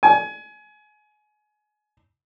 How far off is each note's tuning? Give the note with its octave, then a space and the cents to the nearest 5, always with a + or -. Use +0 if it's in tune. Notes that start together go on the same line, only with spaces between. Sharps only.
G#5 +25